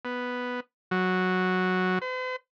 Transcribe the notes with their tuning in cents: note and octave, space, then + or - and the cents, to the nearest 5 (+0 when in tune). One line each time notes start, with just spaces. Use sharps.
B3 +0
F#3 -5
C5 -45